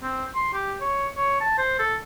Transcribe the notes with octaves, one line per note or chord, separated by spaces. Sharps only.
C4
C6
G4
C#5
C#5
A5
C5
A4